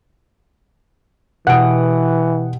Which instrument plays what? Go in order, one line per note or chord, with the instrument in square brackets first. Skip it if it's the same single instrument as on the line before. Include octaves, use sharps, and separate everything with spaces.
[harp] B2 G4 D#6 [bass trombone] E3 [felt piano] F#5 D7